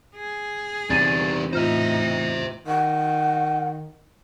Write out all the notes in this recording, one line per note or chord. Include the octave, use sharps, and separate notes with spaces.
G#4
E2 C3 G3 D#4 A6 D#7
A2 D#4 F4 C5 E5 F6
D#3 F#5